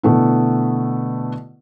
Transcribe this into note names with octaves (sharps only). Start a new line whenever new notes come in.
B2 D3 A3 B3 E4